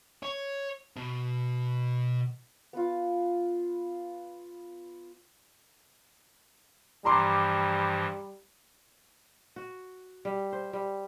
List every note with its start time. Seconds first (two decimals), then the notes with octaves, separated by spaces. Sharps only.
0.23 C#5
0.97 B2
2.73 B3 F4
7.05 G2 E3 F3 G3 A#5 C6 D6
9.56 F#4
10.25 G3
10.53 C5
10.73 G3